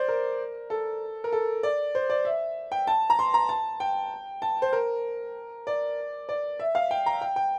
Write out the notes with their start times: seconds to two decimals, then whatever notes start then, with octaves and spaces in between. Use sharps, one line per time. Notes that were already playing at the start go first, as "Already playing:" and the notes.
Already playing: C5 D5
0.08 A#4
0.70 A4
1.24 A#4
1.32 A4
1.63 D5
1.95 C5
2.10 D5
2.25 E5
2.72 G5
2.87 A5
3.10 A#5
3.19 C6
3.34 A#5
3.49 A5
3.80 G5
4.42 A5
4.62 C5
4.73 A#4
5.67 D5
6.29 D5
6.59 E5
6.75 F5
6.91 G5
7.06 A#5
7.21 G5
7.36 G5